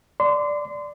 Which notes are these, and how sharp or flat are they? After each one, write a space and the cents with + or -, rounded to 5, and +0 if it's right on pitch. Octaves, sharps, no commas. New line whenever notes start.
D5 +0 C6 -30